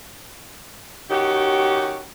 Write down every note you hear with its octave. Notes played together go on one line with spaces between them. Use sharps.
D#3 C#4 F#4 G4